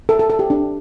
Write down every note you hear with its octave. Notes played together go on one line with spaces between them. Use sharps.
A4
A4
A4
G4
D4